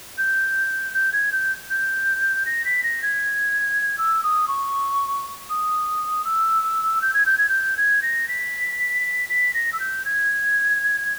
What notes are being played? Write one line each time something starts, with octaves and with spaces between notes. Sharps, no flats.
G6
G6
G#6
G6
G6
A#6
B6
A#6
G#6
E6
D#6
C#6
D#6
E6
G6
G#6
G6
G#6
G6
G#6
A#6
B6
B6
A#6
E6
G6
G#6